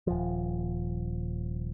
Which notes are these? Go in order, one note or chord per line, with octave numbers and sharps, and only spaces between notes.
D#1 F3